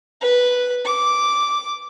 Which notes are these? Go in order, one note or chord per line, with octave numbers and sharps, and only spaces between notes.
B4
D6